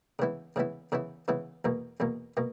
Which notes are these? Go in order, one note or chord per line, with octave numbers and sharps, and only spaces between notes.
C#3 E3 B3 E4
C#3 E3 B3 E4
C#3 E3 B3 E4
C#3 E3 B3 E4
E2 B2 A#3
E2 B2 A#3
B2 A#3